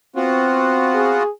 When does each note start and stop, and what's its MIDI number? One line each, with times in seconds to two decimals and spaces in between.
0.16 1.23 59
0.16 1.19 60
0.16 1.23 65
0.16 1.23 66
0.94 1.30 68